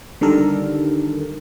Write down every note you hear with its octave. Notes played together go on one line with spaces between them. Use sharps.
D3 D#3 G3 A4 A#4